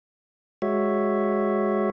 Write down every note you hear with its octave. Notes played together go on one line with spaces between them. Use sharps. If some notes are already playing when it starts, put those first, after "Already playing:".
G#3 F#4 C#5 E5